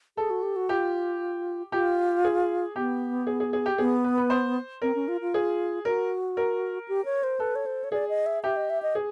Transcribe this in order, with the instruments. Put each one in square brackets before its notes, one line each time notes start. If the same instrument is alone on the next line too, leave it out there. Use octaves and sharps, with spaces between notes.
[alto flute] G#4 [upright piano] A4
[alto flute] F#4
G4
F#4
[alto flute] F4 [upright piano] G4
[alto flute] F4 [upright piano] G4
[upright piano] G#4
[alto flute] B3 [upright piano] G4
[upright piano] G#4
G#4
G#4
G4
[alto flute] B3 [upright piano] G#4
[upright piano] B4
B4
C5
[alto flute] C4 [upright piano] A#4
[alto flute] C#4
F4
F4
[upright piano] G#4
[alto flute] F#4 [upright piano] A#4
[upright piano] A#4
[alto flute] G4
C#5
C5
[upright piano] A4 [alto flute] B4
[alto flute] C#5
C5
C#5
[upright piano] G#4 [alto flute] D5
[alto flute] D#5
E5
[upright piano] G4 [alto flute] E5
[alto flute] D#5
E5
D#5
[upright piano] G#4